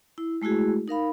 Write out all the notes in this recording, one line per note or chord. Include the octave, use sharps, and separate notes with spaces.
E4
G#3 A3 E4 F#4 G#4
D#4 A#4 F5 B5